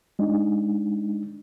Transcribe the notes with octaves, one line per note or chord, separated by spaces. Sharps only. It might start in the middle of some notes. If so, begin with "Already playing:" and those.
G#3 D4 D#4